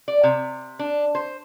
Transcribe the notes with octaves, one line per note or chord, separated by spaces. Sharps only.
D5
C3
D4
C5